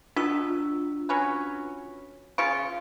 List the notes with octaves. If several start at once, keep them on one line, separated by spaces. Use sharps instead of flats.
B2 D4 F4 E6
F#3 C#4 B4
C#3 F4 C#6 D7